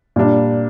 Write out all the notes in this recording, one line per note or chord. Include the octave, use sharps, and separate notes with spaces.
A#2 G3 D4